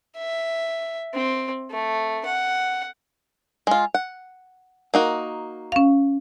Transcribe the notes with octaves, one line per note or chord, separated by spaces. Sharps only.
E5
C4
A3
F#5
G#3 F4
F#5
A#3 D#4 F#4
C#4 F5